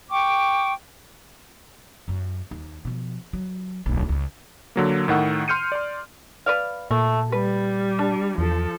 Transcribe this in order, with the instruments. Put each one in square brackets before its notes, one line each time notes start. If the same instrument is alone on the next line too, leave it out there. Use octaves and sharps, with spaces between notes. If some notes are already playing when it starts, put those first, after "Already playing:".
[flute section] G5 C#6 D6
[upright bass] F#2 F#3
D#2
B2 F3
F#3
D1 B1
C#2 C#3
[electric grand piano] D3 F#3 A#3
A2 D#3 F#5 E6
C6 F6 G6 C#7 D#7
D5 C6
[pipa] B4 D5 F5
[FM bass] A#2 [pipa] A3
[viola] G3 [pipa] B4
[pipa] D4
[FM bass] E2 [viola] F3 A4